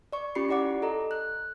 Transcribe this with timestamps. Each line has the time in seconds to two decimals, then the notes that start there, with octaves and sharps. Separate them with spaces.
0.13 D5 C#6
0.35 C#4 F4 G4 B5 C7 C#7
0.49 E4 G4 D5 F#5 D6
0.82 A4 D#5 A#5
1.11 F#6